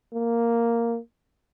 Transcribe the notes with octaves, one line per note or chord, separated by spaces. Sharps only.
A#3